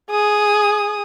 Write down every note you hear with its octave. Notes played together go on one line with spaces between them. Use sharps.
G#4 D#6